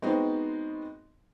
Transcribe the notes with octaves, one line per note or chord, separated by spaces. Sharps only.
G#3 B3 C4 D#4 F#4